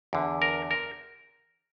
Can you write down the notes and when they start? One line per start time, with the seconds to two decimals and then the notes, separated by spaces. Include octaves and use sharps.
0.13 E2 D3
0.42 A#4
0.71 A#4